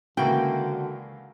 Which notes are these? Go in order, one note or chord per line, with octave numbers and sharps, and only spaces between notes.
C#2 D3 E3 A#3 F#4 G5